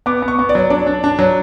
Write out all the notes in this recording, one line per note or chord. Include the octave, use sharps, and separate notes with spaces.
B3 D6
B3
C#6
B3
D5
F#3
D4 D5
D4
D4
F#3